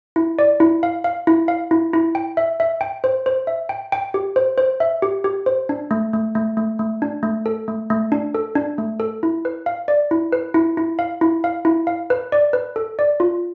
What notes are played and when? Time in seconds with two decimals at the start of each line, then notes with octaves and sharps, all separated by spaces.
0.16 E4
0.39 D5
0.60 E4
0.83 F5
1.04 F5
1.27 E4
1.48 F5
1.71 E4
1.94 E4
2.15 G5
2.37 E5
2.60 E5
2.81 G5
3.04 C5
3.26 C5
3.47 E5
3.69 G5
3.92 G5
4.14 G4
4.36 C5
4.58 C5
4.80 E5
5.02 G4
5.24 G4
5.46 C5
5.69 D4
5.91 A3
6.13 A3
6.35 A3
6.57 A3
6.79 A3
7.02 D4
7.23 A3
7.46 A4
7.68 A3
7.90 A3
8.12 D4
8.35 A4
8.55 D4
8.78 A3
9.00 A4
9.23 E4
9.45 B4
9.66 F5
9.88 D5
10.11 E4
10.32 B4
10.54 E4
10.77 E4
10.99 F5
11.21 E4
11.44 F5
11.65 E4
11.87 F5
12.10 B4
12.32 D5
12.53 B4
12.76 A4
12.99 D5
13.20 F4